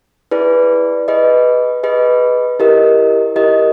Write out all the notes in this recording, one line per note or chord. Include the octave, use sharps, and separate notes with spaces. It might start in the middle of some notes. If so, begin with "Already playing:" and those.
E4 G#4 B4 D5
G#4 B4 D#5
G#4 B4 D#5
E4 G4 A#4 D#5
E4 G4 A#4 D#5